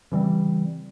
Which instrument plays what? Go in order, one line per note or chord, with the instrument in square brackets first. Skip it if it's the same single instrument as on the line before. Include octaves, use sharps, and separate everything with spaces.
[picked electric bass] C#3 E3 G3 C4